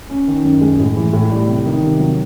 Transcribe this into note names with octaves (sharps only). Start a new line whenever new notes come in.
C#4
D#3
F#2
G#3
A2
E3
A2
G3
C3
D#3
C3
F#3